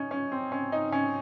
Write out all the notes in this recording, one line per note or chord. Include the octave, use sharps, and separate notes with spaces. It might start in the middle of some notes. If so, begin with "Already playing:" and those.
Already playing: C#4 D#4
C#4
C4
C#4
D#4
C#4